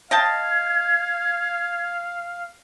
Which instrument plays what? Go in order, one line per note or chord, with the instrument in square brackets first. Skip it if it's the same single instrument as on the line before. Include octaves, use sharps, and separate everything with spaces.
[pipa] D#5 G5 A5 [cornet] F5 [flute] G#6